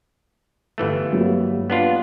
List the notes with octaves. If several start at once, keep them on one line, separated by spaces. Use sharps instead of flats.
G1 E3 A3
F#3 G3 A#3
B3 D4 F4